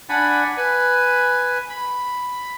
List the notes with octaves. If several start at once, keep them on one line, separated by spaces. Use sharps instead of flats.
D4 D5 F#5 G#5 B5
B4 G#5
B5